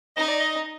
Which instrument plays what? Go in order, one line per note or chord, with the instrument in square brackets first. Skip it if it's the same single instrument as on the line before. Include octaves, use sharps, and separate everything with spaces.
[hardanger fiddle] D#4 [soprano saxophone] D#5
[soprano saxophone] D5
D#5